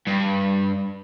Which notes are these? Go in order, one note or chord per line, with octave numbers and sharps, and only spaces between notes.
G2